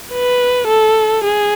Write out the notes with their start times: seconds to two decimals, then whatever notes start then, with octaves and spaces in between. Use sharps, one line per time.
0.13 B4
0.68 A4
1.25 G#4